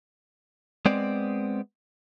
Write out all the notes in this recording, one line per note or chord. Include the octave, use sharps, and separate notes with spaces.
G#3 B3 C4 D5